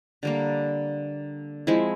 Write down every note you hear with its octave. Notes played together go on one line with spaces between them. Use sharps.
D3 G3 A#3
F3 G#3 C4 E4